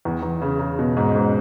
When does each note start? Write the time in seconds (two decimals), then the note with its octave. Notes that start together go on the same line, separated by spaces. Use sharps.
0.05 E2
0.23 E2
0.42 C#3
0.59 C#3
0.79 B2
0.97 G#2
1.15 G#2